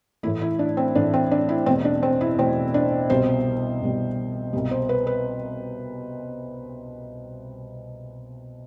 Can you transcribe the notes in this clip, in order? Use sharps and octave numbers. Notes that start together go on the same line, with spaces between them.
A2 E3 A3 E4
E4
D4
C4
A2 E3 A3 D4
C4
D4
E4
E2 B2 A3 C4
D4
C4
E4
E2 B2 A3 C4
D4
C2 B2 G3 C5
C2 B2 G3
C2 B2 G3
C5
B4
B4